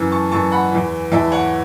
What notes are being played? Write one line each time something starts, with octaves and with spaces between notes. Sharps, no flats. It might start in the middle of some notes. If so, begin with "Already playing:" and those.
Already playing: F#2 E3
A5 C#6
F#2 E3 A5 C#6
F#5 B5
E2 E3
E2 E3 E5 A5
C#5 F#5